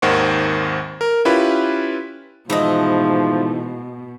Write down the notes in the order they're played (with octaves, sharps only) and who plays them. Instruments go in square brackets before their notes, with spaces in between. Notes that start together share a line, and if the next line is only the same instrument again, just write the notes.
[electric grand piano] G#1 D#2 D#3 C5 F#5 C#6
A#4
C#4 E4 F4 G4 B4 B5
[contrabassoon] G#2 [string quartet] B2 [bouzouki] E3 A3 D#5 [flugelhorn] F3